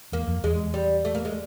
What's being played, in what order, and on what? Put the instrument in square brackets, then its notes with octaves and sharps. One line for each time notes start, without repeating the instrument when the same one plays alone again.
[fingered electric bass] E2 [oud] A#3
[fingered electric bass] F2
[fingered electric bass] E2 [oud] G#3
[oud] G3
A3
A#3
G#3